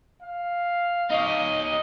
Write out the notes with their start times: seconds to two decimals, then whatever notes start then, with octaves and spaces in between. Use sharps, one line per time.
0.22 F5
1.10 D#4 C#5 D#5